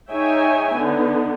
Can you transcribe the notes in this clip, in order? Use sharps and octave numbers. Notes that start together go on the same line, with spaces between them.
D#4 G#4 C#5 E5 G5 G#5
D3 B3 D#4